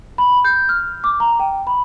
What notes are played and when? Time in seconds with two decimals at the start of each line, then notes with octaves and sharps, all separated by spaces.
0.18 B5
0.45 G6
0.69 F6
1.04 D6
1.20 A#5
1.40 G5
1.67 B5